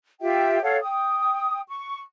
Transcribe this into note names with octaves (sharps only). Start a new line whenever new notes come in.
F4 G4 E5 G5
A4 C#5 F5 F#5
G5 D#6
C#6